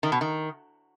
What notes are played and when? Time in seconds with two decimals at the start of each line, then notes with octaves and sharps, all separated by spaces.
0.03 D#3
0.12 B2
0.21 D#3